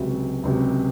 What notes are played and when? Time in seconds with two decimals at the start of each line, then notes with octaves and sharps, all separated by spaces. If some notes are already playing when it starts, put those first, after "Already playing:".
Already playing: C#2 C3 F#3
0.43 C#2 C3 F#3